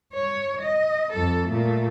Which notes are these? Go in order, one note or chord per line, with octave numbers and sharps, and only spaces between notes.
C#5
D#5
F2 A4
A#2 A3